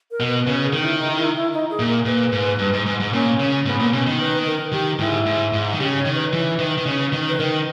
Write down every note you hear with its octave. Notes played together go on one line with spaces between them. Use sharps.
A#4
B2
B4
C#3 B4
G#4
D#3
E4
D#4
E4
E4
D#4
G#4
A#2
A#4
A#2 B4
G#2
G2
G#2
G#2
G#2
A#2 C#4
C#3
G#2 B3
A#2
B2 C#4
D#3
B4
A#4
D#3 G4
G#2 E4
G#2
G#2
D#3
C#3 G4
C#5
D#3
B4
E3
D#3
D#3
C#3
D#3
B4
D#3 A#4